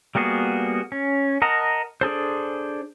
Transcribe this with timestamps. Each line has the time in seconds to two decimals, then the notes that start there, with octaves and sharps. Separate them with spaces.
0.15 G3 A#3 B3 F#4 G#4
0.92 C#4
1.42 A#4 D#5 F#5 A5 A#5
2.01 D4 G#4 A4 C5